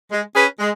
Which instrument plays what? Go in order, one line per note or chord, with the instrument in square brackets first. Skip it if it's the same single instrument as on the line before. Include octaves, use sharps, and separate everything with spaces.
[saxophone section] G#3
C#4 G#4 B4
G#3